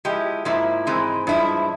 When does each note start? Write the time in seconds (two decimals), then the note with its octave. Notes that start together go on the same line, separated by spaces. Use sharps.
0.05 F3 G#3 E4 G4
0.45 G#2 F3 A#3 E4
0.87 G#2 E3 G#3 C4
1.27 G2 F3 G#3 E4